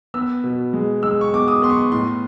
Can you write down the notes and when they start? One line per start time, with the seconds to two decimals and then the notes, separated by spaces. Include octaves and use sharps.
0.14 B3 E6
0.44 B2
0.73 G#3
1.03 G#3 E6
1.21 C#6
1.33 B3 D6
1.48 D#6
1.62 B3 C6
1.70 C#6
1.92 A2 C6